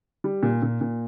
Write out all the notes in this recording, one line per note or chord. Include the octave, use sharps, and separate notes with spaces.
G3
A#2
A#2
A#2